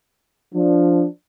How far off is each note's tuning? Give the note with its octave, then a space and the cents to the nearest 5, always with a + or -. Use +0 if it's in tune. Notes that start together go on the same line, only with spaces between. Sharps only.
F3 +0 D4 +0